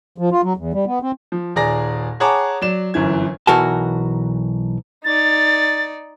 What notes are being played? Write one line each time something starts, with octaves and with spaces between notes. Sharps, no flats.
F3
F4
F#3
E2
G3
B3
C4
F3
D#1 G#4 D5 A#5 A#6
G#4 C#5 F#5 A5 A#5 D6
F#3 D5 E7
G1 F#2 E3 G#6
B1 E3 F#4 A#4 A5
D#4 D5 A6